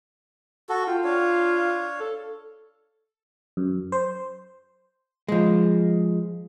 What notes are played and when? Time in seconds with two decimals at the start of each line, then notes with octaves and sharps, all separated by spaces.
0.69 F#4 A4
0.88 F4 G5
1.04 D4 C#5 F5
2.00 A4
3.57 F#2
3.92 C5
5.29 F3 G#3